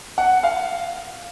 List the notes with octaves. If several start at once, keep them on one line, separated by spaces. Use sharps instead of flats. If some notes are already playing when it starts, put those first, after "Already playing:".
F#5
F5